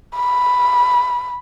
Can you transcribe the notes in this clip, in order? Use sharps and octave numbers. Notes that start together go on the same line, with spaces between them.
B5